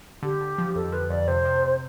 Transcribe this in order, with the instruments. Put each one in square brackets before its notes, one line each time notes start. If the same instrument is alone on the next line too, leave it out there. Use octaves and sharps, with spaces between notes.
[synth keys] D3 [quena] G4
[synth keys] D3
F3
[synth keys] F2 [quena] A4
[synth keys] F3 [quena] B4
[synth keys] F2 [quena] D5
[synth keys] C3 [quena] C5
[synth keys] C3
C3